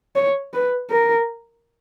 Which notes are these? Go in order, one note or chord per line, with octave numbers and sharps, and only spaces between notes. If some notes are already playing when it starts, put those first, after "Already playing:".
C#5
B4
A#4